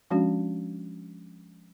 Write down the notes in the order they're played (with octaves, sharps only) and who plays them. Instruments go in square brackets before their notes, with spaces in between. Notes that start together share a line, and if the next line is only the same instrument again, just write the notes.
[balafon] F3 G#3 C#4 D4 F#4